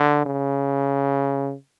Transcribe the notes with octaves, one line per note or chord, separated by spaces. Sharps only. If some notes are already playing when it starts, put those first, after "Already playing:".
Already playing: D3
C#3